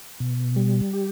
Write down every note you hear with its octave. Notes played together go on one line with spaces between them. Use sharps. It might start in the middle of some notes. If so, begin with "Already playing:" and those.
B2
G3
G4